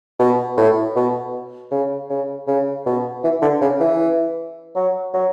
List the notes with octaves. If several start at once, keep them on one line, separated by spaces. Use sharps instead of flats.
B2
A2
B2
C#3
C#3
C#3
B2
E3
D3
C#3
E3
F#3
F#3